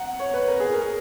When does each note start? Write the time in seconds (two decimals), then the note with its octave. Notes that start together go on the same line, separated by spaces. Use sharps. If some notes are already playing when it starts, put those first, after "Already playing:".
Already playing: F#5 A#5
0.20 C#5
0.34 B4
0.48 A#4
0.60 G#4
0.74 A#4